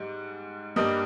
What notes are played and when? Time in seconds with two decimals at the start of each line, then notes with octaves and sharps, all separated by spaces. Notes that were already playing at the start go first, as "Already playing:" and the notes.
Already playing: G#2 G3
0.76 G2 G3 A#3 D#5 D#6